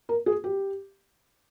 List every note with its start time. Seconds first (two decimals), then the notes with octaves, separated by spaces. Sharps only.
0.09 A#4
0.26 G#4
0.44 G4